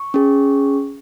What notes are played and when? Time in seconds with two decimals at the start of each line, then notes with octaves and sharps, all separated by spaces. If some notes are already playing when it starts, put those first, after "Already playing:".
Already playing: C#6
0.14 C#4 G#4